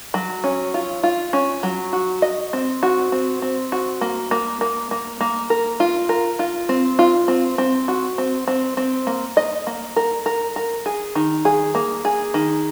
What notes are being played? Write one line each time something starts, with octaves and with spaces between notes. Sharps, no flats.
F#3
C#4
F4
F4
C#4
F#3
F#4
D#5
C4
F#4
C4
C4
F#4
A#3
A#3
A#3
A#3
A#3
A#4
F4
A#4
F4
C4
F4
C4
C4
F#4
C4
C4
C4
A#3
D#5
A#3
A#4
A#4
A#4
G#4
D#3
G#4
A#3
G#4
D#3